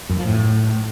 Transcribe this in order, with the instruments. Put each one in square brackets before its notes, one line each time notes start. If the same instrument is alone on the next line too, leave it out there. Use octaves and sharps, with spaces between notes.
[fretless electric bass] F#2
F3
A2